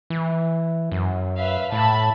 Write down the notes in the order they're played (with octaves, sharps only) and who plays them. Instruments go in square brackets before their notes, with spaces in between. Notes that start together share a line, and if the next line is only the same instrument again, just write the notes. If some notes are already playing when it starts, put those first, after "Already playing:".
[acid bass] E3
F#2
[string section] B4 E5 F5
[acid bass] A2 [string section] E5 A5 B5